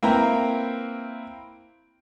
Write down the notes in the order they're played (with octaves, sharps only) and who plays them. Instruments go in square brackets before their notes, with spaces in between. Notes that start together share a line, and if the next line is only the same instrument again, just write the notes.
[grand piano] A#3 C4 E4 B4 G5 A#5